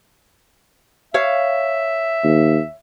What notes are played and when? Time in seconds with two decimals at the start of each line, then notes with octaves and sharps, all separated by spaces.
1.14 C#5 E5 F5
2.24 D#2